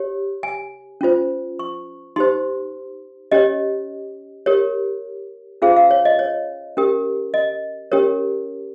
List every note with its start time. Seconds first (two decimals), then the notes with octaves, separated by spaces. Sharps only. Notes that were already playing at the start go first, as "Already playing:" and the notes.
Already playing: G4 C#5
0.43 G#5
1.01 C#4 F4 C5
1.59 C#6
2.16 D#4 G4 C5 C6
3.31 C#4 G4 C#5 D#5
4.46 G4 A#4 C#5
5.62 C#4 F4 G#4 C5 F5
5.77 F5
5.91 C#5
6.05 D#5
6.19 C#5
6.77 C#4 G4 A#4
7.34 D#5
7.92 C#4 G4 A#4 C#5